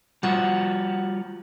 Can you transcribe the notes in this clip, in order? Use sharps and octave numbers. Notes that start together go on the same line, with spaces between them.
G3 F4 F#4 F#5